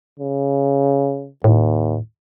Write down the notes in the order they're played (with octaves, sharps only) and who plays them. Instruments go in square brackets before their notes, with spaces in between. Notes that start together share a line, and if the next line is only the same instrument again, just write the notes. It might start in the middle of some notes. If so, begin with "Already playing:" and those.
[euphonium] C#3
[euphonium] D#2 [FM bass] A2